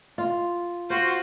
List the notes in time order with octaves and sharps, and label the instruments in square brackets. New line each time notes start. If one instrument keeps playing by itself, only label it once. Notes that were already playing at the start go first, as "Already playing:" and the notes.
[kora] F4
[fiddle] F4 F#4 [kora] C5